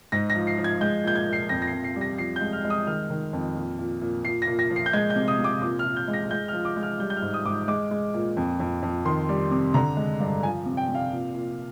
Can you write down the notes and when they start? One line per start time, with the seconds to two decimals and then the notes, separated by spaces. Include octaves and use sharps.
0.12 G#2 A#6
0.30 A#6
0.35 F3
0.47 C7
0.58 F3
0.64 G#6
0.81 G#3 G6
1.04 A#2 G6
1.16 G#6
1.27 A#2
1.33 C7
1.49 F2 A#6
1.62 A#6
1.67 C7
1.72 F2
1.84 C7
1.96 G3
2.01 A#6
2.18 F3 C7
2.36 G6
2.41 G#3
2.53 F6
2.65 G#3
2.70 D#6
2.87 D#3 F6
3.10 D#3
3.33 F2
3.56 A#2
3.78 A#2
4.02 A#2
4.25 A#2 C7
4.42 A#6
4.47 A#2
4.59 A#6
4.70 F3
4.76 C7
4.86 G6
4.93 G#3 G#6
5.10 G6
5.16 C3
5.28 D#6
5.39 C3
5.44 D6
5.62 A#2 D6
5.79 F6
5.85 A#2
5.96 G6
6.08 G#3
6.13 A#6
6.31 G#3 G6
6.48 F6
6.53 F3
6.65 D6
6.76 G#3
6.83 F6
6.99 G3 G6
7.10 G6
7.17 F6
7.22 G#2
7.34 D#6
7.45 G#2 D6
7.51 D#6
7.68 G#3 D6
7.91 G#3
8.14 A#2
8.37 F2
8.60 F2
8.82 F2
9.05 D#3 C6
9.29 G3
9.51 C3
9.74 D3 A#5
9.97 G#3
10.20 G2
10.42 F3 G#5
10.66 C3
10.77 G5
10.89 C3
10.95 F5
11.12 A#2
11.35 A#2